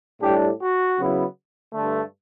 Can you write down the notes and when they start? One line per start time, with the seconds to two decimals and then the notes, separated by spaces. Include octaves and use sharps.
0.22 A2 G3 D4 G4
0.60 F#4
0.97 C#3 F#3 B3 E4
1.73 G2 D3 A3